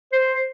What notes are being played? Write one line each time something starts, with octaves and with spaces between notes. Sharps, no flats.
C5